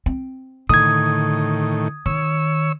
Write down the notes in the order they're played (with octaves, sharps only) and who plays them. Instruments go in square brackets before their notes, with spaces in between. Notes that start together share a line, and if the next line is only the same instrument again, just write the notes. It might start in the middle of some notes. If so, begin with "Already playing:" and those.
[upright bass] C4
[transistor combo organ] A2 D#3 [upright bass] D3 [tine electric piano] D#6 G#6
[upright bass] D#3 [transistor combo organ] C#5 E6